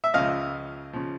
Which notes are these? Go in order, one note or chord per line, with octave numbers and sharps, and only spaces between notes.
E5
C#2 C#3 F3 D#5 F5
C#3 F3